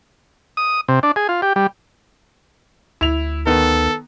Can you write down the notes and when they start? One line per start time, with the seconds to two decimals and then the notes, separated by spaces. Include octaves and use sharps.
0.57 D#6
0.88 C3
1.03 D4
1.16 G#4
1.29 F4
1.42 G4
1.56 G3
3.01 D2 E4 F7
3.47 D#3 B3 A4